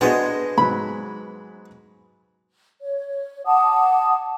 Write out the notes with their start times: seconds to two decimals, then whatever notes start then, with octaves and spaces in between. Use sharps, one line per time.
0.01 G#3 B3 D4 F#4 G#4 C5 D#5
0.58 G#2 F#3 B5
2.81 C#5
3.46 F#5 A5 D6 D#6